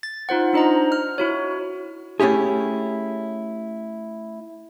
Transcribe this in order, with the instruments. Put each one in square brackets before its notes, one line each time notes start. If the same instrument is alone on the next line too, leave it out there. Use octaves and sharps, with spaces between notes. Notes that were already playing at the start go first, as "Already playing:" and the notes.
[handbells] A6
D#4 F4 C5 F#5
D4 D#4 C5 D#5 A#5
F6
E4 F#4 C#5
[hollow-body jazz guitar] A3 C#4 E4 G4 G#4